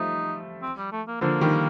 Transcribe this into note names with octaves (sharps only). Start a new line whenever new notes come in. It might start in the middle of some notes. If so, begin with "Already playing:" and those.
Already playing: F3 G3 A3 D#4
C4
G3
A3
A#3
D3 F3 A#3
D#3 G3